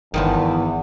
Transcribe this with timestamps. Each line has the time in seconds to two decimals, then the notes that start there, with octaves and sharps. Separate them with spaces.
0.14 G1 E2 D#3 F3 B3